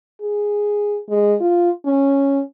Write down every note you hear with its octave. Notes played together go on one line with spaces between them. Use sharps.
G#4
G#3
F4
C#4